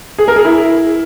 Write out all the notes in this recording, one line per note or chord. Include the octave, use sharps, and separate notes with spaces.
G#4
A#4
G#4
E4